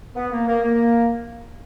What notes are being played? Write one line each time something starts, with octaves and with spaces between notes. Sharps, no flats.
B3
A#3
A#3
A#3